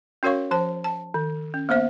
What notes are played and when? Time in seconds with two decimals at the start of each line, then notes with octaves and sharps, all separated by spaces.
0.23 C#4 F#4 A#4 C#5 F5 C#6
0.51 F3 C5 A5
0.84 A5
1.14 D#3
1.54 C#4
1.69 A#3 B3 C5 E5